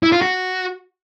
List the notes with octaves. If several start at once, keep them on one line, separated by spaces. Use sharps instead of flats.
E4
F4
F#4